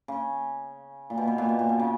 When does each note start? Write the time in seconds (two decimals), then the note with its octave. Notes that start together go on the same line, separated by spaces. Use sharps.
0.08 C#3
1.10 A#2
1.18 B2
1.28 B2
1.38 A#2
1.49 B2
1.59 A#2
1.69 B2
1.79 C#3